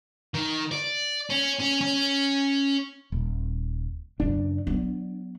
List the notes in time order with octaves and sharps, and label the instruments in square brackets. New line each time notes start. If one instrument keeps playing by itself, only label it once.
[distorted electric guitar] D#3
D5
C#4
C#4
C#4
[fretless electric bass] D#1
[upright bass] F#2 C#3 [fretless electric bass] D4
[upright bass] F#3 B3